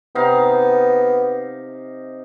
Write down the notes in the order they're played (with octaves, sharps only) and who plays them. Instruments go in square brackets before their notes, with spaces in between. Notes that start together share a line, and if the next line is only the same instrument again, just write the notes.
[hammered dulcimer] C3 D#4 F5 [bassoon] B3